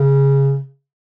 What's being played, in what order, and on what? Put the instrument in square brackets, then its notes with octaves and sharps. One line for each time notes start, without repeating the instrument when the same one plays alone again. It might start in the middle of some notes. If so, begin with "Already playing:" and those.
Already playing: [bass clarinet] C#3